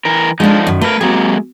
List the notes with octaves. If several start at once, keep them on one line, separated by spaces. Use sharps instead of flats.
E3 A#4
F3 G#3 D4 D#4
F#2 D#3
A3 A#4 B4
F#3 G#3 A#3 C4 G4 G#4